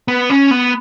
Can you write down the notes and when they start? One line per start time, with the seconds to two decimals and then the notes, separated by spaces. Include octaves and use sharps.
0.08 B3
0.30 C#4
0.51 B3